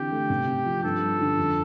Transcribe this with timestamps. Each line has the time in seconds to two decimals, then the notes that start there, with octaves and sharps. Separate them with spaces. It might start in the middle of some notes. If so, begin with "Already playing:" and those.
Already playing: D3 E3 C4 G4
0.12 A3
0.30 C3
0.48 C4
0.65 F3
0.83 G2 A4
1.02 G3
1.20 D3
1.37 F2